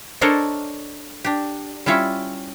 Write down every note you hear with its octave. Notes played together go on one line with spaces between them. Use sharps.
D4 A4 A#4 C5 C#5 D#5
D4 G4
G3 C#4 E4 F4 C#5 E5